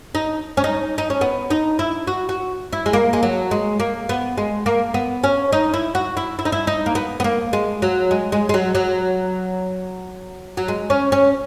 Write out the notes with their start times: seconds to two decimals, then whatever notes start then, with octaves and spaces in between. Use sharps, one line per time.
0.15 D#4
0.57 C#4
0.64 D#4
0.98 D#4
1.10 C#4
1.21 B3
1.50 D#4
1.79 E4
2.07 F#4
2.29 F#4
2.73 E4
2.86 G#3
2.93 A#3
3.13 G#3
3.23 F#3
3.51 G#3
3.80 A#3
4.09 B3
4.38 G#3
4.66 A#3
4.94 B3
5.24 C#4
5.52 D#4
5.74 E4
5.95 F#4
6.17 E4
6.39 E4
6.45 D#4
6.52 E4
6.67 D#4
6.86 A#3
6.95 B3
7.20 B3
7.24 A#3
7.53 G#3
7.82 F#3
8.11 G#3
8.32 G#3
8.49 G#3
8.54 F#3
8.75 F#3
10.57 F#3
10.68 G#3
10.90 C#4
11.12 C#4